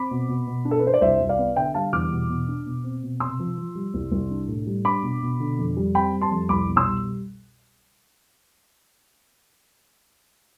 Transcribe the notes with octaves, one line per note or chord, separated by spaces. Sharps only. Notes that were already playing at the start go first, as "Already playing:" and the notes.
Already playing: C4 B5 D6
B2
B2
B2
D4
A4
B4
D4 C5
D5
C2 C5 E5
C2
D5 F5
B3
D3 E5 G5
G3 F5 A5
E2 D6 F6
B2
B2
D4
B2
C4
B2
C3 C6 E6
F3
F3
G3
C2
C2
D4
A2
G3
D4 B5 D6
B2
B2
D3
F2
G3
C4 G5 B5
G3
A5 C6
F2
C2 B5 D6
B2
C6 E6
G3